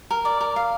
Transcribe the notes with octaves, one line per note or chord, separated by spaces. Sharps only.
A#4
D5
A#4
F5